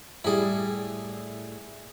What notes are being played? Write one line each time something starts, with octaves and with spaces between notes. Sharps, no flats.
A2 G3 E4 G#4